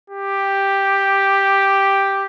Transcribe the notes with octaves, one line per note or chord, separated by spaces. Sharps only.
G4